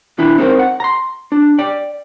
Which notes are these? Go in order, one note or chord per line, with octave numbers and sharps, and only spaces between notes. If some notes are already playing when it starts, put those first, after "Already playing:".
D#3 D4 E4
C4 D#4 F#4 A#4 C5
F#5
A#5 C6
D4
D5 G5